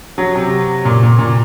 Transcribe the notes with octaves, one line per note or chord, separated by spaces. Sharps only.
F#3
C3
A#2
A#2
A#2